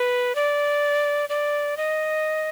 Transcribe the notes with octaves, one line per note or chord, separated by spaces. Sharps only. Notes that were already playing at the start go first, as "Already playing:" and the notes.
Already playing: B4
D5
D5
D#5